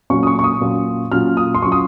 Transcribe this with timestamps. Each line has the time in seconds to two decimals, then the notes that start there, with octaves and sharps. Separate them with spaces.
0.10 A#2 F#3 C#4 F4 C#6
0.23 D#6
0.27 C#6
0.39 C#6
0.44 D#6
0.61 A#2 F#3 C#4 F4
1.12 A#2 F#3 C#4 F4 F6
1.37 D#6
1.55 C6
1.62 F#3 C#4 F4 C#6
1.72 D#6